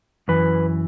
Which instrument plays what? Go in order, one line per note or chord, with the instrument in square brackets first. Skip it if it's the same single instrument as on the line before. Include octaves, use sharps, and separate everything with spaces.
[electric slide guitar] F#2 E3 B4